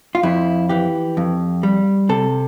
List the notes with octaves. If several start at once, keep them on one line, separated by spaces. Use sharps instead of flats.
F4
F2 E4
E3 G4
F2
G3
C3 A4